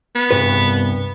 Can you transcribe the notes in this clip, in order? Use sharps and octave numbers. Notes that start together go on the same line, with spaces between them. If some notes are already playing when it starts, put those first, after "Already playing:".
B3
C2 G2 B4